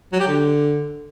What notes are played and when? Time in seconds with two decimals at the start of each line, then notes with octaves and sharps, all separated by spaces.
0.12 F#3
0.20 G4
0.28 D3